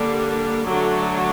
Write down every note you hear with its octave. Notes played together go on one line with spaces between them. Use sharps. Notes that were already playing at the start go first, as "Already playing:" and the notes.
Already playing: D3 G3 A#3 D4
D3 F#3 A3 D4